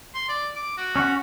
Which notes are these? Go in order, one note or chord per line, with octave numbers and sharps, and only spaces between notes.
C6
D5
D6
F#4
C#4 C#5 F#5